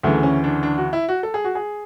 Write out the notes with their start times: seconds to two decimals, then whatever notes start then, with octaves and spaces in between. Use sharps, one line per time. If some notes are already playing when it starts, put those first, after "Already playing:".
0.03 D2 C#3 E3 A3
0.23 C#4
0.44 D4
0.63 D4
0.78 F#4
0.93 E4
1.09 F#4
1.23 A4
1.34 G#4
1.44 F#4
1.55 G#4